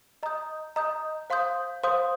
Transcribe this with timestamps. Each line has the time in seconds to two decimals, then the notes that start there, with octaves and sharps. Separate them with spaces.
0.23 D#5 A#5 D#6 G6
0.76 D#5 A#5 D#6 G6
1.30 C5 F5 C6 D#6 G6
1.83 C5 F5 C6 D#6 G6